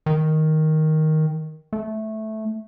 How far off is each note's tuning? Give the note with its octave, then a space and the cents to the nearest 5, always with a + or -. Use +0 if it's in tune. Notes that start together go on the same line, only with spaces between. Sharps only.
D#3 +5
A3 -10